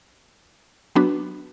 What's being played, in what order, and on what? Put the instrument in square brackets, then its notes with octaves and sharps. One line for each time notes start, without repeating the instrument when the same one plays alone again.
[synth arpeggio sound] F#3 B3 D4 F#4 B4